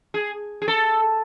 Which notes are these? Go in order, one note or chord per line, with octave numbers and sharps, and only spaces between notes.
G#4
G#4
A4